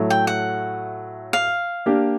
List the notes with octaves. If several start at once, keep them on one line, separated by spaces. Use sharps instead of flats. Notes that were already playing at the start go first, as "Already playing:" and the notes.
Already playing: A2 F#3 A3
G5
F#5
F5
A#3 D4 G4